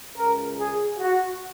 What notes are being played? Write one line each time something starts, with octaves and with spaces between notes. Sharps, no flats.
C#2 C#3 A#4
G#4
F#4